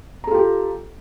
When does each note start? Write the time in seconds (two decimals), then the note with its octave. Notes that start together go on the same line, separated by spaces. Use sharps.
0.24 A#5
0.27 A4
0.31 F4
0.34 G4